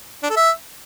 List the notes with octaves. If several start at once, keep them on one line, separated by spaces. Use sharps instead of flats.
D4
A4
E5